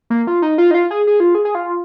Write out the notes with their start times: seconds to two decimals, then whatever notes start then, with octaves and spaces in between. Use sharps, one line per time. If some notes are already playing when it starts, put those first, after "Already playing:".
0.10 A#3
0.27 F4
0.42 D#4
0.58 F4
0.71 D#4
0.74 F4
0.91 G#4
1.07 G#4
1.20 F4
1.35 G#4
1.45 G#4
1.55 F4